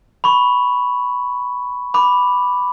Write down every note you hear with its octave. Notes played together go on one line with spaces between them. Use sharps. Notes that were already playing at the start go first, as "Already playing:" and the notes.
B5 C#6
B5 D6